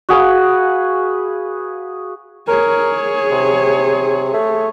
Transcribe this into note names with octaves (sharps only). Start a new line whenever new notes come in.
F#4 G#4 B4 F5
G#4 A#4 C#5
C3
A3